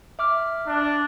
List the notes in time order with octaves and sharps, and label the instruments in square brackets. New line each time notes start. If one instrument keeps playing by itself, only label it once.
[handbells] E5 D6 F6
[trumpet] D4